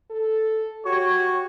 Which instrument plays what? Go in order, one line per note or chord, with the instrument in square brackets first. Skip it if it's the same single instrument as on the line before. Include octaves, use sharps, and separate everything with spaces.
[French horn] A4
[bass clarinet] F#4 [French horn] G4 [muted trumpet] C#5